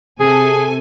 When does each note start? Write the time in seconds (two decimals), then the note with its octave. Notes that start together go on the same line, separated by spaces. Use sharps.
0.20 C3 G#4 A4 G#5